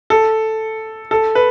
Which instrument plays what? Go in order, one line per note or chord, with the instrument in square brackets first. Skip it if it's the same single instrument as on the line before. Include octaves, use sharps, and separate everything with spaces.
[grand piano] A4
A4
B4